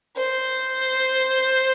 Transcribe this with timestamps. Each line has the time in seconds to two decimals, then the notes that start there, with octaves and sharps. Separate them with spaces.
0.17 C5